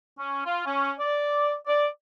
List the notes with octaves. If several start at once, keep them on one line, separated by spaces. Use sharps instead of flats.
C#4
F4
C#4
D5
D5